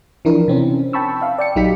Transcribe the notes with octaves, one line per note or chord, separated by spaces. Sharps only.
E3 F3 D4 E4 A#4
C3 C4 C#4
G5 A5 B5 C#6 E6
E5 F5
D5 G5 C#7
A#1 F#3 D#4 G4 B6